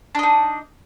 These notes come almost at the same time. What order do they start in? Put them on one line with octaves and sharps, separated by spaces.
D4 D#5 D#4